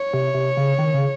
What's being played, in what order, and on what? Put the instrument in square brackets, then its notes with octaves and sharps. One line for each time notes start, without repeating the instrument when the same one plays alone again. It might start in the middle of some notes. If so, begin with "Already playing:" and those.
Already playing: [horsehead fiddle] C#5
[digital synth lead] C3
C3
C#3
D#3
C#3